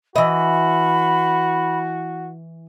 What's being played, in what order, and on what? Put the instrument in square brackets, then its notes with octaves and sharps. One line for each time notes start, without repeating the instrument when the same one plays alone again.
[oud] E3 D#5 [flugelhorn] F#4 [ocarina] B5